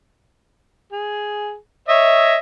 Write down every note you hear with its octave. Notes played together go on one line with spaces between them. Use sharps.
G#4
C#5 D#5 E5